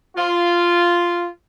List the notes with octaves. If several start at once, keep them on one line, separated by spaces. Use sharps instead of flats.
F4